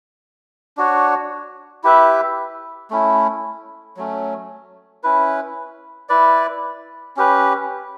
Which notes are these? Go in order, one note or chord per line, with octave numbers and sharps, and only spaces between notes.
D4 F#4 C#5
E4 G4 B4 E5
A3 C#4 E4
F#3 A3 C#4
C#4 E4 B4
E4 B4 D5
C#4 G4 B4